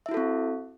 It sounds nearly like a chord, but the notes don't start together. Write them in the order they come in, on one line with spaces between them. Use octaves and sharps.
E5 E4 F#4 A4 C4